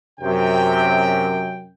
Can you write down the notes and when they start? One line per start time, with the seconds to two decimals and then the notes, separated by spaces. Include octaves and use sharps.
0.20 F#2 C3 G5